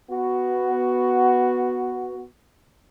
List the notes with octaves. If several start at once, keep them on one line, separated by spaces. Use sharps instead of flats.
B3 F#4